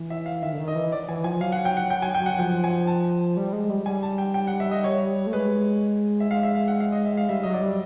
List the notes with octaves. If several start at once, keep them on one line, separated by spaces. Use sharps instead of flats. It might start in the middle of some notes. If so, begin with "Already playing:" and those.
Already playing: E3
E5
F5
D#3 E5
D3
D#3
D#5
E3
D5
E3 G#5
F3 G#5
F#3 F5
F#5
G5
F#5
G5
G#5
G5
F#5
F3 G5
G#5
A5
G3
G#3
G3
G3 G#5
A5
G5
G5
F#5
E5
D#5
C#5
A3
G#3 B4
E5
G#3 F5
E5
F5
F#5
F5
D#5
E5
F5
G3 E5
F#3 D#5
D5
G3